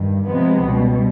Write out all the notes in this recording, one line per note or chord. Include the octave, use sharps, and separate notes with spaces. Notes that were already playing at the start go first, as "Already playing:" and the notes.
Already playing: G2 D#3
C3 F3 G#3 B3
C#2 B2 G3